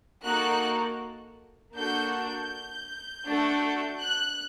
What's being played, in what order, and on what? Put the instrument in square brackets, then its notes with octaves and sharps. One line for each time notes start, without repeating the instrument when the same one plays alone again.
[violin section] A#3 D#4 F#4 A4 F#6
A#3 D4 F#4 A4 G6
G6
A3 D4 F#4 A4
F#6